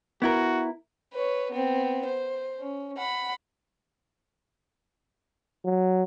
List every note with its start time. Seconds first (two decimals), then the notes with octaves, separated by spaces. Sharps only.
0.22 B3 E4 F#4 A#4
1.13 B4 C#5
1.51 B3 C4
2.05 C5
2.59 C#4
2.98 F#5 B5
5.65 F#3